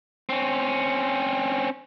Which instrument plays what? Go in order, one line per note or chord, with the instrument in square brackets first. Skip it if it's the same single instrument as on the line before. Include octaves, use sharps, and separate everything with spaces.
[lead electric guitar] C4 C#4